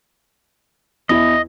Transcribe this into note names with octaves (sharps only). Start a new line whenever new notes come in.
E2 E4 D#5